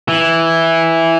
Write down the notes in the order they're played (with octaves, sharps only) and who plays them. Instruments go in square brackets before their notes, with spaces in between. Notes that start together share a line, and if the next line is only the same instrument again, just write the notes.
[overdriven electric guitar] E3